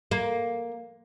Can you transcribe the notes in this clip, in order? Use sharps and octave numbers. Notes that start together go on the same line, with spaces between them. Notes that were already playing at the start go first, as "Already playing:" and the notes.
A#3